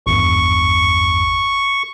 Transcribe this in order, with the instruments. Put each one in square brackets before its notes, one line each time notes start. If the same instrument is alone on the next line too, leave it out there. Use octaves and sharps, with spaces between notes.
[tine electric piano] G#1 E2 G2 [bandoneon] C#6